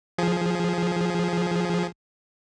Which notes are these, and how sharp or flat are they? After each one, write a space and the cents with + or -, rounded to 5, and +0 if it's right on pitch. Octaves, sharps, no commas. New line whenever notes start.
F3 +0 G#4 +5